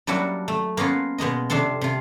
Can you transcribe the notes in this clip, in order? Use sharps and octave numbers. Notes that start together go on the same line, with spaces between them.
F#3 G3 A#3 D4 E4 F#4
A3
A#3 B3 C#4 F4
B2 G#3 A#3 D#5
F2 C3 D4 A4 C6
C3 F4